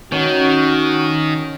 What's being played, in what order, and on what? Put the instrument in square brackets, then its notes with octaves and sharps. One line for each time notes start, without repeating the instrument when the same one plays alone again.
[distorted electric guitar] D#3 [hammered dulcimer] C#4 [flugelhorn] F#4